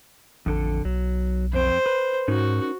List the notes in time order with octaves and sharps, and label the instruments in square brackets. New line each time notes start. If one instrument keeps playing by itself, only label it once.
[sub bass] A1 [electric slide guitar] F2 D3 A4
[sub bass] B1 [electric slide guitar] F#3
[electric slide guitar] F2 C4 [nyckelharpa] C5
[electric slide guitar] B4
[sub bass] G#2 [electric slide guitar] C#4 D#4 A#4 [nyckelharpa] F#4